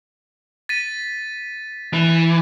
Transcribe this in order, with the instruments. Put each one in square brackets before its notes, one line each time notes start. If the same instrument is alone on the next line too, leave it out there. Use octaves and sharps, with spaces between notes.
[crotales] A6 B6 D#7
[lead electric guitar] E3